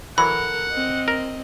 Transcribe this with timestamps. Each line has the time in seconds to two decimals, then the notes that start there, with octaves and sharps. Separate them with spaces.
0.18 E3 F#3 A4 A#4 F#5 B5
0.72 C4 D#5
1.08 A#4